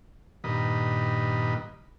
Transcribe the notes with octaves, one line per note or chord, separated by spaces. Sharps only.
G2 A#2 D#3 B4 D#5